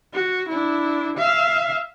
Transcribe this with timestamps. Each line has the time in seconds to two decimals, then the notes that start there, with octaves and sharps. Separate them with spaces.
0.13 F#4
0.49 D4 E4
1.17 E5 F5